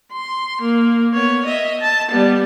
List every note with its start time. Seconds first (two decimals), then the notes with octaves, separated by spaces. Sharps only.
0.13 C6
0.62 A#3
1.13 B3 C#5
1.46 D#5 E5
1.81 A5
2.11 G3 B3